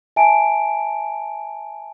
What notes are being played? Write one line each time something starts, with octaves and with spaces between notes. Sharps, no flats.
E5 G#5 A5 D7